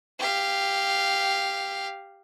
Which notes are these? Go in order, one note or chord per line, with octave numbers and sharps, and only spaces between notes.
G4 F5